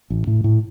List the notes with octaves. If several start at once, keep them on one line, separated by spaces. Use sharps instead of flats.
A1
A2
A2